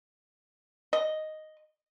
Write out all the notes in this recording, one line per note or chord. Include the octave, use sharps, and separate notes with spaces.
D#5